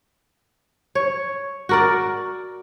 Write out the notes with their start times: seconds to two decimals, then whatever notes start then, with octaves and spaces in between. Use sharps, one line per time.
0.95 C#5
1.69 F#4 A#4 D5